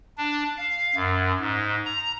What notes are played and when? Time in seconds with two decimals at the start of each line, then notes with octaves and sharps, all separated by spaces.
0.18 D4
0.58 F5
0.95 F#2
1.40 G#2
1.86 A#5